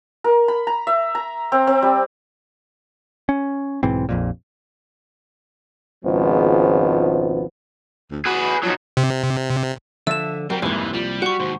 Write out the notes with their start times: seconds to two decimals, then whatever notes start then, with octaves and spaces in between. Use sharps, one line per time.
0.24 A#4
0.48 B5
0.67 A#5
0.87 E5
1.15 A#5
1.52 C4
1.67 C4
1.82 G3
3.29 C#4
3.83 B1 G#2 E3 C4
4.09 A#1 F2 A#2
6.04 G#1 C#2 F3 B3
8.11 D2
8.26 F#4 G#4 B4
8.64 F3 F#3 D#4
8.97 C3
10.07 D3 F3 E5 A5 E6 E7
10.50 F#3 G3 C4 A#4 G5
10.62 F#1 C2 F2 G#2 E3 A#3
10.93 F3 G3 F#7
11.22 F#4 F#5 C#6
11.40 D#2 G#2 C5